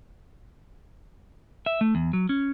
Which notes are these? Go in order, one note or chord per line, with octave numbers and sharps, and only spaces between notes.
E5
A3
E2
F#3
C#4